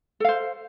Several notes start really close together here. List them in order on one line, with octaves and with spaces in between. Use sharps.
A4 F5 C5